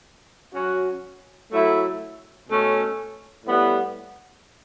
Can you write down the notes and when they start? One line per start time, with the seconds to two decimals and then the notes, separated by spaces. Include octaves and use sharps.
0.54 F#3 C#4 F#4
1.51 F#3 A3 E4
2.48 B2 A3 C#4
3.44 A2 G3 B3